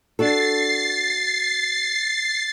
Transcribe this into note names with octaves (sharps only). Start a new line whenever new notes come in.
D4 F#4 A4 A6 C7